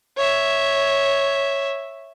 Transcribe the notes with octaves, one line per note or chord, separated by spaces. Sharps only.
C#5 E5